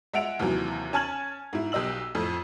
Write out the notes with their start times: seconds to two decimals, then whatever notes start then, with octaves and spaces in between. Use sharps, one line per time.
0.13 G#3 E5 F#5 D7 F7
0.39 D#2 C3 E3 F#3
0.93 C#4 G#5 A5 F6 G#6 F#7
1.53 G#2 E4
1.72 B1 G4 D#5 E6 F#7
2.15 F2 A2 F3